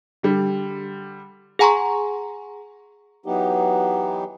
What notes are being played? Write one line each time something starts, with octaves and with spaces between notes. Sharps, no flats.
D3 G3
G#4 F#5 G#5 A#5 C6 C#6
E3 F#3 B3 D#4 G4